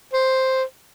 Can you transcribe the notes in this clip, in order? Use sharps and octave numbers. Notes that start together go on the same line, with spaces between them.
C5